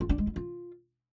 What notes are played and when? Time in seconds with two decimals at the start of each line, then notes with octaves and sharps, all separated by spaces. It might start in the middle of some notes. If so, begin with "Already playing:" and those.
0.01 F4
0.09 D4
0.18 G#3
0.27 E4
0.36 F4